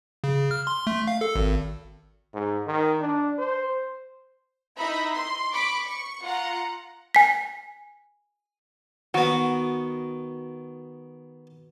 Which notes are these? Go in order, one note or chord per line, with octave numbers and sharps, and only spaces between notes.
C#3
F6
C6
A3
F5
A4
G#1
G#2
D#3
D4
C5
D#4 E4 E5 B5
C6
B5 C#6 D6
C#6
F4 F#5 A#5
G#5 B6
D#3 B3 F#4